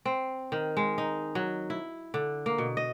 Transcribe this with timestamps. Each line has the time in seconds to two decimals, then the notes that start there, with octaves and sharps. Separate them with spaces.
0.05 C4
0.52 D#3
0.77 G#3
0.98 D#4
1.35 F#3
1.70 E4
2.14 D3
2.46 A#3
2.58 B2
2.77 D#5